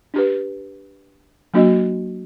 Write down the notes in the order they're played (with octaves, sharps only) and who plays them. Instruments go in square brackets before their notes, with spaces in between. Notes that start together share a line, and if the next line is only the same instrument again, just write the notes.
[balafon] D4 G4 B4
F#3 A#3 D4 F#4 D#5